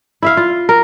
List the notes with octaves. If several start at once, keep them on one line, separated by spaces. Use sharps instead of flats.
E4 E5 F5
F4
A#4